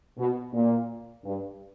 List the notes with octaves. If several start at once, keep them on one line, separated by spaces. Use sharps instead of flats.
B2
A#2
G2